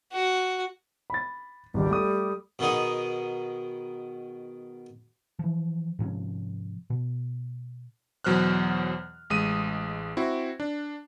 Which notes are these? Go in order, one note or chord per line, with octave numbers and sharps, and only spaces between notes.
F#4
B5 A6
G#1 C#2 G3
A3 D#6
B2 D#3 B3 D#4 G#4
E3 F3
G#2 C3 F3 C#4
B2
E2 B2 F#3 C5 F6 F#6
A1 G#3 D#6 D#7
C4 E4 F#4
D4